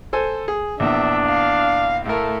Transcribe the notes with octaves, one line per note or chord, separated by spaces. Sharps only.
A4 C5 G#5
G#4
A#1 E2 D4 E5
F5
A2 A3 A#4